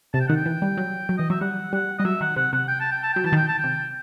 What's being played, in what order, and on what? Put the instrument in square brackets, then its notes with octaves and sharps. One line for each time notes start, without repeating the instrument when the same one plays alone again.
[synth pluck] C3 [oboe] A5
[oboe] G5
[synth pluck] D#3 [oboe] F#5
[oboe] G5
[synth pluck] E3
G3
F#3
F#3
[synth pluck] E3 [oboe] D#5
[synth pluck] F#3 [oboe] E5
[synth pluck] G3 [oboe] F#5
[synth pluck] G3 [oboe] F#5
[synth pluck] G3 [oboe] D#5
[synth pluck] F#3 [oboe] E5
[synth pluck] D#3 [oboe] F#5
[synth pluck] C3 [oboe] F#5
[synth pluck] C3 [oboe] F#5
[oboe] G5
A5
G5
A5
[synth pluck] F#3 [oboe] G5
[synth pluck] E3 [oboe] A5
[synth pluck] D#3 [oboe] G5
[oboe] A5
G5
[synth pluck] C3